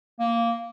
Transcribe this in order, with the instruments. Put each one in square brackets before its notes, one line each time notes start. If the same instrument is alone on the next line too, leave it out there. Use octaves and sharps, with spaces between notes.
[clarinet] A#3